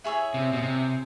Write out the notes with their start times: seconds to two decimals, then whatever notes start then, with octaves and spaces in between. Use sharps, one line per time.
0.04 E4 G#4 C#5 E5
0.34 C3
0.53 B2
0.62 C3